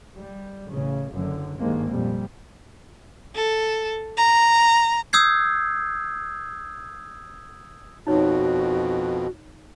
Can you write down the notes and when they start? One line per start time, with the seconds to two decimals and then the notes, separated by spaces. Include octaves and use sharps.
0.17 G3
0.69 A1 C#3
1.12 F#1 F#2 D3
1.57 G#1 G2 D#3 G#3 A#3 C4
1.89 F2 A#2 G3
3.35 A4
4.17 A#5
5.13 D#6 E6 G6 G#6 C7
8.07 F2 B2 D#4 F#4 C#5